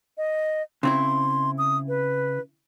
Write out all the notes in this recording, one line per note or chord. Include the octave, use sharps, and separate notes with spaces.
D#5
C#3 C4 E4 C6
D#6
B4